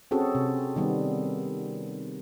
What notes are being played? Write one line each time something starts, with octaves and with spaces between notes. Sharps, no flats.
C4 C#4 F#4 G#4 A4
C3
D#3 G3 B3